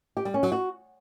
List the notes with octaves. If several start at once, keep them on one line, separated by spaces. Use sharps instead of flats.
G4
G3
C#4
F#3
F#4